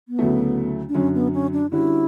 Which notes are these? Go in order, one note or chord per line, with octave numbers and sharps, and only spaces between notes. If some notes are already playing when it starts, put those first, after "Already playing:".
B3
D2 C#3 F#3 A3 E4
D4
F#2 D3 F#3 C#4
B3
C#4
D4
D3 G3 C#4 E4 F#4